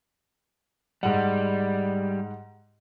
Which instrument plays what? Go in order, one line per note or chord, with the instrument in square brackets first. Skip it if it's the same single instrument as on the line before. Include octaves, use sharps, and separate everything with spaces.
[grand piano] G#2 F#5 [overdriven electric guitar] G3